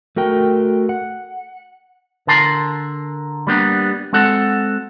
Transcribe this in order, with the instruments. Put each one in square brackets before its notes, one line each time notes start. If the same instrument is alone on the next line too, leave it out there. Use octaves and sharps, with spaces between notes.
[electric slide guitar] A3 F#4 A#4 G5
F#5
[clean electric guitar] D3 A#4 A5 C6
G3 A#3 B3 D4 G4
G#3 C4 F#4 A4 F#5